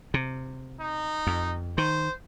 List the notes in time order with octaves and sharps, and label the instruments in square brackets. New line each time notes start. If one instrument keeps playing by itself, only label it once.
[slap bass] C3
[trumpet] D#4
[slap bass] F2
[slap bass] D#3 [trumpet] C5